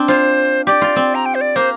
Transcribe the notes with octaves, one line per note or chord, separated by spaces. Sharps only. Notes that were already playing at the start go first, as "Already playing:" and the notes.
Already playing: C4 D4
F4 C5
G4 D5
F4
C4
A#5
G5
C5
D5
A#3 C5